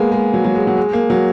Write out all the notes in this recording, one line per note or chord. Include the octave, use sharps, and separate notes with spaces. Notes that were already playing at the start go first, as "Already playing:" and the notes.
Already playing: G#3 A#3 B3
G#3
F#3
F#3
G#3
F#3
G#3
A#3
F#3